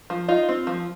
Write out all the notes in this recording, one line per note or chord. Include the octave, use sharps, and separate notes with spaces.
F3
D#4 F4
C4
F3